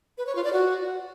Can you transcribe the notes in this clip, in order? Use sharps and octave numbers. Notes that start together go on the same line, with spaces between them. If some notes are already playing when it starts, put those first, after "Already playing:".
B4
C#5
F4
D5
F#4